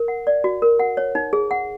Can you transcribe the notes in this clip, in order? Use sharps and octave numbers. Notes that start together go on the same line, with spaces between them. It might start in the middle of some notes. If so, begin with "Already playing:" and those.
Already playing: A#4
F#5
D5
F#4
A#4
F#5
C#5
D#4
G#4
F#5